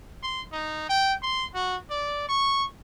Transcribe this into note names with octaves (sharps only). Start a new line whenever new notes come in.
C6
D#4
G5
C6
F#4
D5
C#6